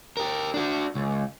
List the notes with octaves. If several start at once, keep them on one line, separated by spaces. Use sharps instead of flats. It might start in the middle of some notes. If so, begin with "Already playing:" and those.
G4 A#4
D4 F#4
C#2